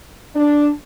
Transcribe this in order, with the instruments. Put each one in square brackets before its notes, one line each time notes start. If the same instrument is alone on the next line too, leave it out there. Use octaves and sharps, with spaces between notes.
[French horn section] D4